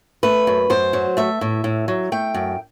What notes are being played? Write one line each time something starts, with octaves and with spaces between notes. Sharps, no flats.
A3 B4
F#2
F#2 C5
F#3
A3 E5
A2
A2
F#3
A3 G5
F#2